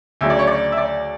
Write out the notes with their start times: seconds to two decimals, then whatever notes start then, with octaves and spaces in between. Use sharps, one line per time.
0.21 D2 C#3 F#3 E5
0.30 D5
0.39 C#5
0.47 D5
0.72 E5
0.77 D5